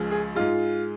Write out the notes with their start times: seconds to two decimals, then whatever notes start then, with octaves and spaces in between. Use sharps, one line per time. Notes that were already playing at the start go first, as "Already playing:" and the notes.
Already playing: C#2 C#3 F3 G#3
0.11 G#4
0.35 G#2 G#3 F4